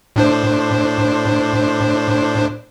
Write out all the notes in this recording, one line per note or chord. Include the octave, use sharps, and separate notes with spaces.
A2 D4 C5